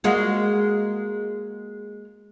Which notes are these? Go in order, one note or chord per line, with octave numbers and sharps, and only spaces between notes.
G#3 A#3 F#4